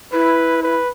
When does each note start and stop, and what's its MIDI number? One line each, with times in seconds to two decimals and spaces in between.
0.13 0.76 64
0.13 0.62 71
0.63 0.89 71